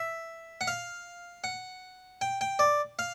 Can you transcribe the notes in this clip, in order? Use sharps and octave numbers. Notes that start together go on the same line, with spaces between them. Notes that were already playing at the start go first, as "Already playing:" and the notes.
Already playing: E5
F#5
F5
F#5
G5
G5
D5
F5